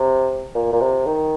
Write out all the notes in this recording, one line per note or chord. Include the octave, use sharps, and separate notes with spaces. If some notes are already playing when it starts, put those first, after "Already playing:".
Already playing: C3
A#2
A#2
C3
D#3